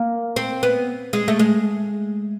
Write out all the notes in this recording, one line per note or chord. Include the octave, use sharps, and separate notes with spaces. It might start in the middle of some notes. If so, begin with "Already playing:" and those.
Already playing: A#3
C4
B3
G#3
A3
G#3